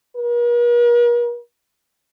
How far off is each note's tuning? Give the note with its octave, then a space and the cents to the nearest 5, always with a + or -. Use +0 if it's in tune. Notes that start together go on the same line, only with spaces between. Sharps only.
A#4 +45